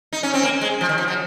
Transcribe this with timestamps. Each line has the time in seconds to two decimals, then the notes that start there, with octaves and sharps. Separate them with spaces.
0.13 D#4
0.23 C#4
0.34 C4
0.43 A#3
0.61 G#3
0.81 F3
0.89 D#3
0.98 F3
1.08 F#3